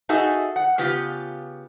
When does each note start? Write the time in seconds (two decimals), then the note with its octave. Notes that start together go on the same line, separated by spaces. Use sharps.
0.09 D#4 F#4 G#4 A4 E5
0.56 F#5
0.78 C#3 B3 F4 G4